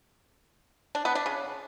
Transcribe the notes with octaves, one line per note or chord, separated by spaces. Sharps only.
D4
B3
D4
C#3